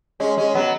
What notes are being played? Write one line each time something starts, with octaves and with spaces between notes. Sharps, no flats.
G#3 C#4
G#3 C#4
F#3 B3